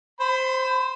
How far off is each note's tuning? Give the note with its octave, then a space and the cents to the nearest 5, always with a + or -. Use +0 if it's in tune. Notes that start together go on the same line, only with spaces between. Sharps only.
C5 +0 B5 +35